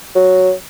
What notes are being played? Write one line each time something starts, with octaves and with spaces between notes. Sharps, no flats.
F#3